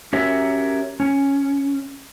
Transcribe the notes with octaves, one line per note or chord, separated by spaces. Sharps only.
C#4 F#4 G4 A#4 C#5 E5
C#4